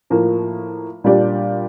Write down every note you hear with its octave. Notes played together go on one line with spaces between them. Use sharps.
A2 F3 A#3
A#2 G3 D4 G4 D5